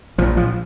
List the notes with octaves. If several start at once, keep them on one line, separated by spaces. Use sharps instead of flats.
A#1 A#2 F3
F3